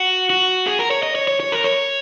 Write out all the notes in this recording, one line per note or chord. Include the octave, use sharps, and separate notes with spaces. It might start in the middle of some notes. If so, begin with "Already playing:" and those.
Already playing: F#4
F#4
G#4
A#4
C#5
D#5
C#5
C#5
C#5
A#4
C#5